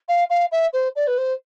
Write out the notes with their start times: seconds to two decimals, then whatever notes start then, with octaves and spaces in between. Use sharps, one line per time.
0.08 F5
0.30 F5
0.52 E5
0.73 C5
0.95 D5
1.07 B4
1.18 C5